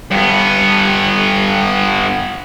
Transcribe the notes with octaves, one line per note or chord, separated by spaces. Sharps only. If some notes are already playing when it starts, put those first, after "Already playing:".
G2 B3